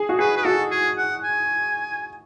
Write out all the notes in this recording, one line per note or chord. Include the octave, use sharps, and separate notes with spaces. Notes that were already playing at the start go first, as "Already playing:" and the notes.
Already playing: G#4
F#4
G#4 B4
B4
F#4 A4
G#4
F#5
G#5